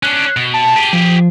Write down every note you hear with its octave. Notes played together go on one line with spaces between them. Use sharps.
C#4 D4 F#6
B2
A5
G4 G#4
F3